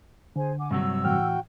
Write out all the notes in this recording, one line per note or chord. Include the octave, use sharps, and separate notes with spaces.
D3 G#4 C5 G#5
F#5 G#5 D6
G2 C3 F#3 F#5 E6
A2 E3 F#4 G5 F6